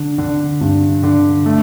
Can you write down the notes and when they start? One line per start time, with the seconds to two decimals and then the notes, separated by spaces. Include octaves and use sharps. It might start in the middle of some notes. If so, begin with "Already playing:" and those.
Already playing: D3
0.18 D3
0.61 G2
1.03 D3
1.46 A3